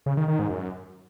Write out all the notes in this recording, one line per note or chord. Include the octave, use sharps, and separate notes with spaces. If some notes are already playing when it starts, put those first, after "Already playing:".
C#3
D#3
D#3
G#2
F#2